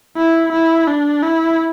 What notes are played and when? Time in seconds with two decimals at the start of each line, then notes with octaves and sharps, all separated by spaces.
0.17 E4
0.52 E4
0.87 D4
1.22 E4